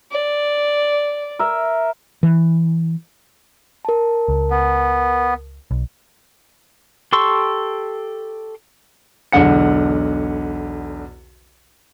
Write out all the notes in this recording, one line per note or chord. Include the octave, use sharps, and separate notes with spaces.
D5
A#4 E5
E3
A#4 A5
C#2
B3
B1
G4 A4 C6 C#6 E6
B1 E2 D3 F#5 C#7